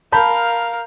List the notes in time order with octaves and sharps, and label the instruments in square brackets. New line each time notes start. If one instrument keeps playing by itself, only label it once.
[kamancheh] A#4 F5 [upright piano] A5 B5 G6